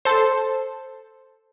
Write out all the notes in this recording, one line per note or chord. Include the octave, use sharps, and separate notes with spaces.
A4 C5